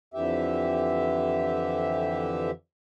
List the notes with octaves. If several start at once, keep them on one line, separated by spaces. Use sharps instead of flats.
F2 D3 E3 G4 E5